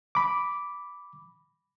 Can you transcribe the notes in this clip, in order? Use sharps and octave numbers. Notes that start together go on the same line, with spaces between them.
B5 D6